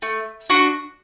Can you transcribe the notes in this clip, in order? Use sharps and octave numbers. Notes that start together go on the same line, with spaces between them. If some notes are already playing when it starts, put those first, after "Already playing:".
A3
D4 F#4